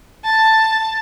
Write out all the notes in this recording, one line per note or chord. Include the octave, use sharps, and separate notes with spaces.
A5